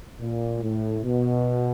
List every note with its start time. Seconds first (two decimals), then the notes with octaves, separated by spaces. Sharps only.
0.20 A#2
0.62 A2
1.04 B2